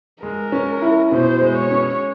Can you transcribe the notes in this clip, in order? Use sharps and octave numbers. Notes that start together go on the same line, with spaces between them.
G#3 A#4
C#4
E4
B2 C5
G#3
C#5
C#4